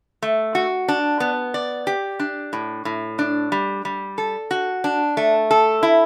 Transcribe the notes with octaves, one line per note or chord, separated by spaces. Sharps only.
A3
F#4
D4
B3
D5
G4
D4
A2
A2
D4
G3
G3
A4
F#4
D4
A3
A4
E4